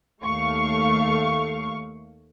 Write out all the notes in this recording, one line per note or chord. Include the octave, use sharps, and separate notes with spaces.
D#2 A3 F5 C#6